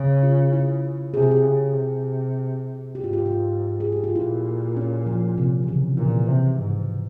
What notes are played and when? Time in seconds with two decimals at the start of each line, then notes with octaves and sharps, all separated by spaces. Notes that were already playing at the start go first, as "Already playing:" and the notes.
Already playing: C#3
0.23 F4
0.53 E4
1.14 C3 G#4
1.23 G4
1.31 G#4
1.43 C#3
1.73 C3
2.95 G#2 G4
3.04 F4
3.13 G4
3.26 F4
3.80 G#4
3.92 G4
4.04 F4
4.15 A#2 E4
4.77 C#4
5.06 F3
5.38 C3
5.63 E3
5.68 C#3
5.97 A#2 E3
6.27 C3
6.59 G#2